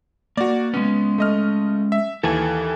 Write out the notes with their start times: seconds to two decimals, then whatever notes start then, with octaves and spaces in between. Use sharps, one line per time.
0.37 A#3 F#4 D5
0.74 G#3 B3 C#4
1.18 A3 D#5 F6
1.92 E5
2.23 D#2 E3 A4 G#5